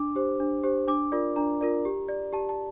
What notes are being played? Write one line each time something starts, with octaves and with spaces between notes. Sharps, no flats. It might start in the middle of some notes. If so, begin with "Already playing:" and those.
Already playing: D4 D6
G4 C5
D4
G4 C5
D4 D6
F4 A#4 D5
D4 A#5
F4 A#4 D5
G4
D5
G4 A5
A5